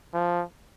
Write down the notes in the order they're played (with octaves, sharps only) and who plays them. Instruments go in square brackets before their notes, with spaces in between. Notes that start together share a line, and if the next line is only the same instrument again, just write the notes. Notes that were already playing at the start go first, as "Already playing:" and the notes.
[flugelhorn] F3